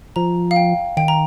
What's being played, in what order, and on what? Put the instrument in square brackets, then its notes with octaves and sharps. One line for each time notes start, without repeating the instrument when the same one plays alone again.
[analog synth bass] F3 [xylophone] A#5
[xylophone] F5
G5
[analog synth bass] D#3 [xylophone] G5
[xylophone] A#5